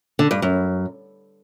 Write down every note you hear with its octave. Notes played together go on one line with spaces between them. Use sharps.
D3
G2
F#2